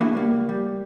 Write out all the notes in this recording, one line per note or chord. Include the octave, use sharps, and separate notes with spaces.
A#3 D4 E4 F#4 G#4
C#2 G3 A#3
G3